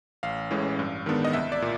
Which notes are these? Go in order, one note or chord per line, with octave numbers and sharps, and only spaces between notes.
A1 F5
A2 E3 G#3 C#4
G2
D#3 G#3 B3 D4
D#5
C2 E5
D5
A#2